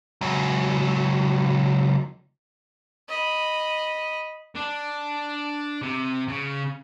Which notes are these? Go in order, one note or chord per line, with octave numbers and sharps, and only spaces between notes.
C#2 F#3
D#5 B5
D4
C3
C#3